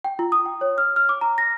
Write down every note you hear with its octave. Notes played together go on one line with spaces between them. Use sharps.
G5
F4
D#6
G5
C#5
F6
F6
D6
A#5
A#6